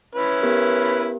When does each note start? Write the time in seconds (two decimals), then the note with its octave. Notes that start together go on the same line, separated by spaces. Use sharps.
0.15 C#4 E4 B4
0.41 B3 G4 A#4